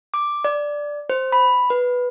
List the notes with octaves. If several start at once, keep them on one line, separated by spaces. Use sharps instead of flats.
D6
D5
C5
B5
B4